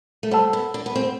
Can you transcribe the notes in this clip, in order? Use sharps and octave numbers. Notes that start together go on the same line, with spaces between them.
A3
G3 C5 F#5 A5 E6
B3
D4
B3
C4